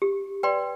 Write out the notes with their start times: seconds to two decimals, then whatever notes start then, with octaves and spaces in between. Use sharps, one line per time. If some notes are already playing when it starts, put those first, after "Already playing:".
0.02 G4
0.43 B4 D5 G5 C6